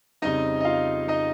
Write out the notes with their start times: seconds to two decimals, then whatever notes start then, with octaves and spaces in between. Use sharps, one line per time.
0.22 F2 C#3 G3 C4 D#4 D#5
0.60 D#5
0.65 F4 F5
1.08 D#4 D#5